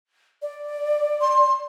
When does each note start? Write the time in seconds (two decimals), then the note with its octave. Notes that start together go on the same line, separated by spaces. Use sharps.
0.42 D5
1.21 C6